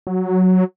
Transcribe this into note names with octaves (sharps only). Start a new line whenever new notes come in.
F#3